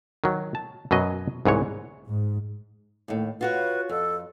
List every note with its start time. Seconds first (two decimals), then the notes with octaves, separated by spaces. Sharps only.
0.24 D#3 F#3
0.55 A5
0.91 F#2 B2 F#3 D#5
1.45 C2 G#2 E3 C#5
2.07 G#2
3.08 D#2 A2
3.41 F4 F#4 B4 C#5
3.89 F2 A4